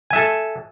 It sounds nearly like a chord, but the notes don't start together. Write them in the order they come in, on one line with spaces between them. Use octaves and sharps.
G#5 E5 A4